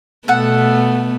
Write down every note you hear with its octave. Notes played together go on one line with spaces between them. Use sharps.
B2 A3 B3 A4 F#5